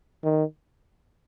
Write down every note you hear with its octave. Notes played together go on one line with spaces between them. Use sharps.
D#3